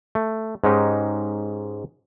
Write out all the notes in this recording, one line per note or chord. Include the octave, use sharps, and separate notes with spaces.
A3
G#2 G#3 C#4 D#4 G4